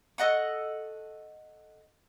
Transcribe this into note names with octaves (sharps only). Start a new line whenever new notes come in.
A4 D#5 F#5 C#6